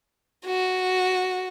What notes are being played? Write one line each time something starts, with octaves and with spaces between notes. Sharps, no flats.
F#4